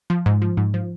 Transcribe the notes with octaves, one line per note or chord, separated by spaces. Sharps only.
F3
G#2
F3
G#2
F3